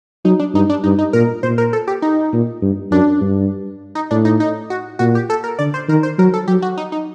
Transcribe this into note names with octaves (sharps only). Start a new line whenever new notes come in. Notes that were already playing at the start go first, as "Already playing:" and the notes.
F#3 D#4
D4
G2 D#4
D4
G2 D#4
D#4
A#2 A#4
A#2 C5
A#4
A4
G4
D#4
A#2
G2
F#2 D4
G2
D#4
A2 D4
D#4
D#4
F#4
A#2 F#4
G4
A4
A#4
D3 D5
C5
D#3 A#4
C5
F#3 A#4
A4
F#3 G4
F#4
D#4
D#4